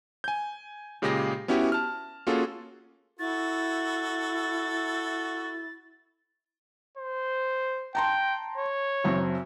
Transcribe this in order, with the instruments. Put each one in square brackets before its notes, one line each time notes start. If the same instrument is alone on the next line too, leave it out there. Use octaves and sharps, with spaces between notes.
[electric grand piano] G#5 G6
A#2 C#3 G#3 G4 G#4 A#6
B3 C#4 E4 F#4 G4
A5 F6
A#3 C#4 F4 F#4 G#4 A4
[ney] E4 [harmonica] F#4 A4 [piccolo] A6
[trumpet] C5
[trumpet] G5 [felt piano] A5 A#5 C6
[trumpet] C#5
[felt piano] F#1 F#2 C4